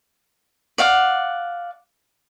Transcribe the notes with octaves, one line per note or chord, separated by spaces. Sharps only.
D5 F5 F#5